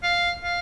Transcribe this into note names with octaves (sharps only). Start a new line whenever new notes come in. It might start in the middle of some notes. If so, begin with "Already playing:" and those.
F5
F5